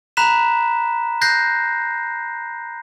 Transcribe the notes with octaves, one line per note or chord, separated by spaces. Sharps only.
A#5 B5 F#6 B6 E7
F#6 G6 A#6 C7